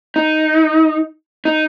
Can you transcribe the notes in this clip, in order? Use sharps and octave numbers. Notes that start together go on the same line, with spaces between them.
D#4
D#4